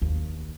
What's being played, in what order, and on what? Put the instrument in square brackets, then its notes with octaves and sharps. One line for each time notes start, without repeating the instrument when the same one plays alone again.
[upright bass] D#2